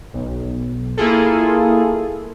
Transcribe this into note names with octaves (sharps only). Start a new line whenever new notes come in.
B1
A#3 E4 F4 G#4 A4